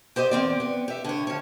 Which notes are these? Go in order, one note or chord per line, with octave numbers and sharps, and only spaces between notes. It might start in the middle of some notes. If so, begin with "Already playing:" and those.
G4 C5 D5 D#5
E2 C4 D5
B3
G4 E5
D3 C#5
F3 C#5